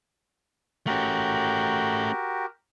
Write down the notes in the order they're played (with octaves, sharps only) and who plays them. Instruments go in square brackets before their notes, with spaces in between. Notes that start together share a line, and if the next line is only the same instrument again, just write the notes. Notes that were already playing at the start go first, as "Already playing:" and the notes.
[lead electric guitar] A3 C#4 [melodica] F#4 G4 A#4